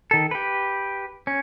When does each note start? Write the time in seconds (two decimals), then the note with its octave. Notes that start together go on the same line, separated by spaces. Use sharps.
0.11 D#3 A4
0.31 G4 B4
1.27 C#4